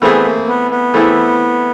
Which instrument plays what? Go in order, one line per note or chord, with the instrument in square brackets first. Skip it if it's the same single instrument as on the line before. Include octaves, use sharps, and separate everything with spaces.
[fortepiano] E3 A3 C4 E4 G#4 [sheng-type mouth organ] B3
[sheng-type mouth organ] A#3
B3
B3
[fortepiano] E3 A3 C4 E4 G#4